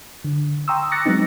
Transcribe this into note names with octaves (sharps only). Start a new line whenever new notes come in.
D3
G5 A#5 C6 C#6 D#6 E6
D6 F#6 A6 A#6 C#7
F#3 G#3 B3 C4 D#4